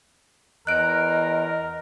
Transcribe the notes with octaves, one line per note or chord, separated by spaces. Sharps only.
E2 A#4 D#5 F#6 D7